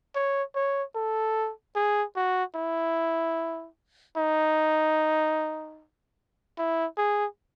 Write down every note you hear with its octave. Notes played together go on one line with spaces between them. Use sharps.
C#5
C#5
A4
G#4
F#4
E4
D#4
E4
G#4